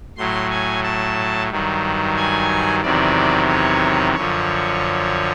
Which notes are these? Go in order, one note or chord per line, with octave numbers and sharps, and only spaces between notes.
A2 F#3 C6
G#5
A5
G2 D#3 F#3
G#5
E2 C3 D#3 F#3 D5
C#5
F#2 D3 F3 C#5